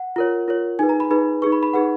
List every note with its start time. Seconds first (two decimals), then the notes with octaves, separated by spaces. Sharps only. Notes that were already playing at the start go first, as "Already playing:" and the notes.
Already playing: F#5
0.16 F4 A#4 C#5
0.48 F4 A#4 C#5
0.79 D#4 G#4 B4 G#5
0.89 A#5
1.00 B5
1.10 D#4 G#4 B4 B5
1.42 D#4 G#4 B4 C#6
1.52 B5
1.63 B5
1.73 D#4 G#4 B4 F#5